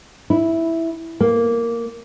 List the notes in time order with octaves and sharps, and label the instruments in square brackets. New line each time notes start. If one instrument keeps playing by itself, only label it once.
[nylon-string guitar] E4
A#3